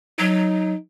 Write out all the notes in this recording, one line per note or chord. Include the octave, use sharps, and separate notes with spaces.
F#3 D#4